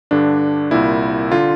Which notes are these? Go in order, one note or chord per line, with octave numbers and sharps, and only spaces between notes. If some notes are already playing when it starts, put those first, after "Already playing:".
G2 D3 D4
C2 A#2 E4
D3 F4